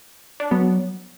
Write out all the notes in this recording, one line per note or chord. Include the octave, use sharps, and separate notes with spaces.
D4
F#3 B3